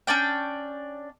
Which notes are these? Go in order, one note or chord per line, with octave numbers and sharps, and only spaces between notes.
C#4 D4 D5 G5